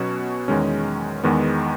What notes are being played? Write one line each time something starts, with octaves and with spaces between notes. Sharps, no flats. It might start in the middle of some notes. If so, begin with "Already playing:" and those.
Already playing: B2 F#3 C#4 F#4
E2 D#3 G#3 C#4
E2 D#3 G#3 B3